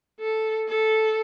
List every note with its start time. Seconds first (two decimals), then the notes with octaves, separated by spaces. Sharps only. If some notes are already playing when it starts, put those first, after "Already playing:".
0.20 A4
0.68 A4